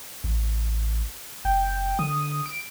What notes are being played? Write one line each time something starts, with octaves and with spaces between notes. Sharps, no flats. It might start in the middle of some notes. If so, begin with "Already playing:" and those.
A1
F#1 G5
D3 D#6
D7